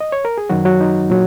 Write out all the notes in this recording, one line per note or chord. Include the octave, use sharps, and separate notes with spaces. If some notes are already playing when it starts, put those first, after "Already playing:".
D#5
C#5
A#4
G#4
F#2 D#3 F#3 F#4
F#3 F#4
D#4
A#2 F#3